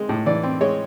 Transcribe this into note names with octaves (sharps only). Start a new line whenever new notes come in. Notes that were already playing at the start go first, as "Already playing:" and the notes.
Already playing: G#3 C4
A2
E3 D5
C4
G#3 C#5